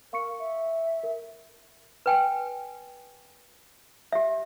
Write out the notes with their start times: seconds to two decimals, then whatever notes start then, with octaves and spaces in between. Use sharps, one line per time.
0.13 A#4 F5 C#6 C#7
0.39 E5
1.03 A#4
2.06 B4 G5 G#5
4.12 G4 E5